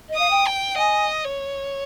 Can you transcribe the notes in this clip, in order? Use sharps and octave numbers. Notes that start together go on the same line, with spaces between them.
D#5
F5 D#6
G5
G5
D#5 G#5
C#5